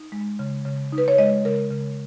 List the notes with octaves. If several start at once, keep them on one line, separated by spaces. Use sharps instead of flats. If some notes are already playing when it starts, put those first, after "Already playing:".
Already playing: D#4
G#3
C#3
C#3
D#4
B4
C#5
G#3 D#5
C#3 A#4
C#3